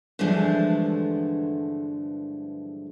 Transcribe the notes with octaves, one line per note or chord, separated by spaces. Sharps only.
G2 D3 E3 F3 G#3 A3